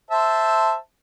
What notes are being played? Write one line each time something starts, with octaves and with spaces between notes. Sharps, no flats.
C5 E5 A5